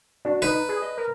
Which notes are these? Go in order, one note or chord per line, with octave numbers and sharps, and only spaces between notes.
D4 F#4
D#4 B4
G#4
D#5
A#4